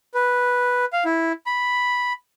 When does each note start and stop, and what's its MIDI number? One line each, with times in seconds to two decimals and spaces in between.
0.14 0.85 71
0.93 1.04 77
1.05 1.32 64
1.46 2.13 83